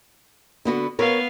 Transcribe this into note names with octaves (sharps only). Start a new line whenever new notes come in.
D3 B3 F#4
B3 A#4 C#5 F5